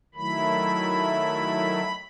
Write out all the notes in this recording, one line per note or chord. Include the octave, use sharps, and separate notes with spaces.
D#3 F#3 A3 E4 B5